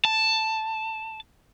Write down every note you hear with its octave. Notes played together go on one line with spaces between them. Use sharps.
A5